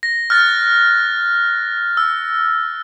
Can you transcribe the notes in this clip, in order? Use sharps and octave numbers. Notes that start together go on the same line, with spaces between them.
A#6
F6 F#6 A6
E6